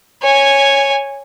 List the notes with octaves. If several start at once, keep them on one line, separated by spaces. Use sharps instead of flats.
C#5 G#5